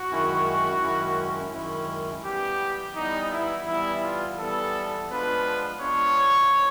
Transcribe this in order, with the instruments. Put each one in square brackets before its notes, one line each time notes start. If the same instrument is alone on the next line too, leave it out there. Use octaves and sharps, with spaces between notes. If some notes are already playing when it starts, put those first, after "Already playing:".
Already playing: [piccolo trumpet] F#4
[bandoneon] F#2 D#3 G#3 C#4 E4
F#2 D#3 G#3 C#4 E4
F#2 D#3 G#3 C#4 E4
[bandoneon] E3 G3 B3 [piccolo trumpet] G4
[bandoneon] E3 G3 B3 [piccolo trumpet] D#4
[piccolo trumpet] E4
[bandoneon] E3 G3 B3 [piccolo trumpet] E4
[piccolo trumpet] F4
[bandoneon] E3 G3 B3 [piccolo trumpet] A4
[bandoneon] F3 G#3 B3 D4 F4 [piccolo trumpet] B4
[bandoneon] F3 G#3 B3 D4 F4 [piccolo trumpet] C#5
[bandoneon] F3 G#3 B3